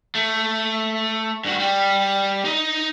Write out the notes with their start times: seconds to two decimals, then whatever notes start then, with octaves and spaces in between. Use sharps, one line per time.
0.15 A3
1.45 G2 F#4
1.59 G3
2.45 D#4 D#5